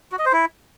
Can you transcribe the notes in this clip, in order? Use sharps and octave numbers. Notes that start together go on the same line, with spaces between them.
F#4
D#5
C5
E4